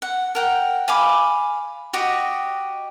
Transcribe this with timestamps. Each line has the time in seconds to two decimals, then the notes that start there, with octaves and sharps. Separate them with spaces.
0.02 F#5
0.35 A#4 F#5 G5
0.88 F5 G#5 B5 D6
1.93 F#4 G4 D#5